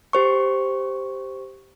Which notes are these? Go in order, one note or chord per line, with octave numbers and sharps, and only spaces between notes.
G4 C5 C#6